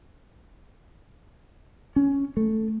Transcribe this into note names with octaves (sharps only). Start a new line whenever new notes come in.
C#4
A3